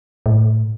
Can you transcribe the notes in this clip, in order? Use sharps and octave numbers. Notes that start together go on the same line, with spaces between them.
A2